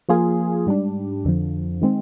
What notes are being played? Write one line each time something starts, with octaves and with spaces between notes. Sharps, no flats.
F3 A#3 F4 G#4
G#2 G3 D4
F2 D3 F3
D#3 G#3 C4